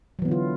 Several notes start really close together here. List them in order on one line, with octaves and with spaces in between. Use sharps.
F#3 E3 B3 D3 F4